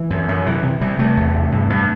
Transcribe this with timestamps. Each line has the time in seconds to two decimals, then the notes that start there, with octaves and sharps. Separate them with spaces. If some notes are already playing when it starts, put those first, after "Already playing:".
Already playing: E3
0.10 F#2
0.28 F#2
0.46 C3 E3
0.63 C3
0.81 C3 G3
0.99 C3 A3
1.17 E2
1.34 C3
1.52 G2
1.70 G2